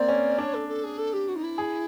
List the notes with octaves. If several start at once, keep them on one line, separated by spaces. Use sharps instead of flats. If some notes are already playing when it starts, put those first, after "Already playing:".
Already playing: A#3 C4 D5
C#4
D4 C#5
A4
A4
G#4
A4
G4
F#4
D#4
E4
G#4